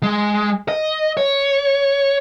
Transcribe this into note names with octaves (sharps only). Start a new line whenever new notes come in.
G#3
D#5
C#5